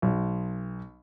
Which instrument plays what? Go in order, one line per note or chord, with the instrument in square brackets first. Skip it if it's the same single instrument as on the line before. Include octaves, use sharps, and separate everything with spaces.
[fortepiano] B1